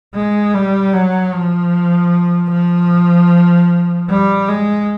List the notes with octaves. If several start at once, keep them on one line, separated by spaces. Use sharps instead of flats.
G#3
G3
F#3
F3
F3
G3
G#3